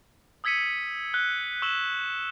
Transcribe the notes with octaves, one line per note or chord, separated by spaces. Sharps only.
D#6 E6 G#6 B6 C#7 D#7
F#6 G7
C#6 E6 F#6 E7 F#7 G7